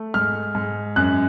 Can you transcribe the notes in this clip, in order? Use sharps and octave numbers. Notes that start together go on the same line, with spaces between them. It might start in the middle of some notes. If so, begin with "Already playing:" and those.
Already playing: A3
G#2 F6
G#2
F#2 F#6